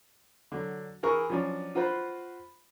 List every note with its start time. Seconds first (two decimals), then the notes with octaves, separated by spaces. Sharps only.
0.52 D3 F#3
1.03 E3 G#4 A#4 C#6
1.30 F3 F#3 C#4 D4
1.75 F4 F#4 B4 C5